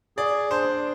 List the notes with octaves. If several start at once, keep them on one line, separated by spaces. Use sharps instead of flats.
G#4 D5
D4 C5